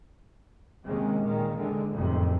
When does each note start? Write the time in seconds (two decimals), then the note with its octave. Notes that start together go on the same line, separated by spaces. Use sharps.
0.85 D#2 C3 D#3 G#3 C#4
1.25 A#2 D#3 G#3 A#3
1.56 D3 E3 G#3
1.94 F#1 F2 A2 C3 D#3